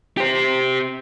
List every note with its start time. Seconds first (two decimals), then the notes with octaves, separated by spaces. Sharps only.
0.17 G4 C5